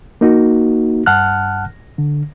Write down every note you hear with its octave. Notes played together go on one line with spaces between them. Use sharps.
A#3 D#4 F#4
G2 F#5 A5 F6 F#6
D3